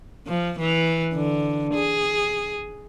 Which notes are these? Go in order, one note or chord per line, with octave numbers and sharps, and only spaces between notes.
F3
E3
D3
G#4